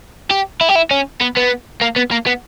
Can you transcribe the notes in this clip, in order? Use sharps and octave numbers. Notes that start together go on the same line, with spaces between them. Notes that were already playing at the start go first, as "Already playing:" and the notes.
G4
E4
G4
E4
C#4
B3
B3
A#3
B3
A#3
B3